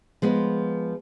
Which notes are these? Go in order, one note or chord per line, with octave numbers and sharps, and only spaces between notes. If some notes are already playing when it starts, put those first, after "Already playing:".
F3 G#3 B3